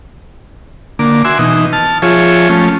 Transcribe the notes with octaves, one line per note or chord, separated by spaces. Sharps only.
D3 A#3 D6
F#4 E5 G#5 C6 E6
B2 E3 D#4
A5 F6
F3 F4 G#4 C#5 E5
F3 A3 C#4